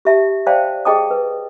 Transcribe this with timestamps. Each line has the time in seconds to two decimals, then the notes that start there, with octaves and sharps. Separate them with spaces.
0.05 G4 E5 A5
0.47 C5 D5 F5 G5 A5
0.85 G#4 D#5 G5 A5 D#6
1.10 B4